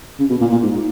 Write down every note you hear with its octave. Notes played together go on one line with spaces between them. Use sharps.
C#3
B2
A#2
A#2
G#2